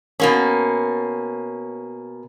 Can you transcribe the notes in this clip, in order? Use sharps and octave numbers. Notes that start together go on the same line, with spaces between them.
B2 A#3 C#4